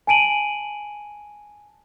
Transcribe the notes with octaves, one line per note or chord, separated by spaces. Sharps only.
G#5 A5 D7 D#7 F#7